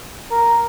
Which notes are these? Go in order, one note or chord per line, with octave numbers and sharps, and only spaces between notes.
A#4